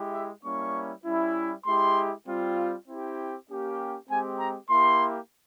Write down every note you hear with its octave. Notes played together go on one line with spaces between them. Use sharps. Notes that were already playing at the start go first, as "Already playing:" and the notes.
Already playing: G#3 E4 G4
E5
G3 A#3 C#4 E4 C#6
G3 C#4 E4
G#3 E4 G4 C6
G3 C4 F4
C4 E4 G4
A#3 C#4 G4
G#3 C4 G4 G#5
A#5
A#3 E4 G4 C6